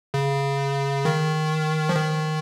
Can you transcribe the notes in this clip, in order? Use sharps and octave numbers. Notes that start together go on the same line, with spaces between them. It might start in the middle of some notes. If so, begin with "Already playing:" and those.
C#3
D#3
F3
D#3